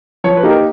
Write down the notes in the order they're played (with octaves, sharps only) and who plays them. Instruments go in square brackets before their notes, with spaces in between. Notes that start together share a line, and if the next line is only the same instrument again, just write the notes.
[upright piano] F3 [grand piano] C#5
[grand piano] B4
[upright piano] A#3 D#4 G4
[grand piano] A#4